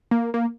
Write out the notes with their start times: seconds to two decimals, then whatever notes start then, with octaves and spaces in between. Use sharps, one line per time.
0.11 A#3
0.34 A#3